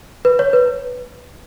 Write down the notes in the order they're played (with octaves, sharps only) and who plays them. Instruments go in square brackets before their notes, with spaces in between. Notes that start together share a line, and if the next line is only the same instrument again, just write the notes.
[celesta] B4
C#5
B4